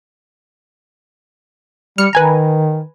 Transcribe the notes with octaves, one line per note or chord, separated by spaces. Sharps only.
G3 F6 C#7
D#3 B4 G#5 A#5